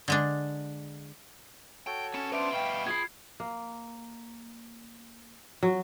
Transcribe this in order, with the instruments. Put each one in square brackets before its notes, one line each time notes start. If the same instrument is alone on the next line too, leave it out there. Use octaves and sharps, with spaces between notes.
[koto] D3 G#3 D4
[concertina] F#4 A4 C#5 [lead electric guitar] G5
[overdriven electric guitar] C#4 [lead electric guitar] B4 A5 [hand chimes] C#7
[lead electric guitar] B3 F4 [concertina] D4 C5 [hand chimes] B4 E5 D7
[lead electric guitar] G2 B2 [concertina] F5 B5 [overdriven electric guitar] G5
[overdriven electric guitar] F4 B5 [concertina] G#4 [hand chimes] G#6 C7
[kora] A#3
F#3